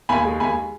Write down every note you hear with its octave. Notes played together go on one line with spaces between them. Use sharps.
D#2 G#5 B5
G#3
D#2 G#5 B5